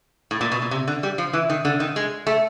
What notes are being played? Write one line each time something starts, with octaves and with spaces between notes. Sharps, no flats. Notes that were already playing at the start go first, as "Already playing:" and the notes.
A2
A#2
B2
A#2
C3
D3
G3
F3
E3
D#3
D3
D#3
G#3
A3